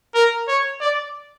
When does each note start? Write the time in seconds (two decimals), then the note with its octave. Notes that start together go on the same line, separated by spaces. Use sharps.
0.14 A#4
0.48 C#5
0.81 D5